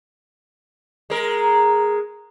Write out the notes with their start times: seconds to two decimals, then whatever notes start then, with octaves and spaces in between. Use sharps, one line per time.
1.10 G#3 A#4